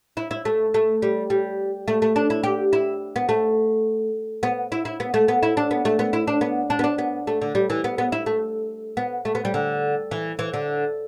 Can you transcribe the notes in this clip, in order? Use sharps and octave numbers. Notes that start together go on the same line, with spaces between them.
E4
E4
A3
A3
G3
G3
A3
A3
D4
E4
G4
E4
B3
A3
B3
E4
E4
B3
A3
B3
E4
D4
B3
A3
B3
E4
D4
B3
D4
B3
D4
B3
A3
D3
G3
E3
B3
B3
E4
A3
B3
A3
B3
G3
D3
E3
E3
D3